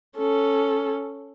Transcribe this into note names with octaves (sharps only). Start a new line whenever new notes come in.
C#4 A4